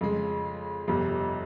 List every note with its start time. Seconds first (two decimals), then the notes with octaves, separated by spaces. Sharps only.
0.01 F2 C#3 G#3
0.88 G1 F2 C3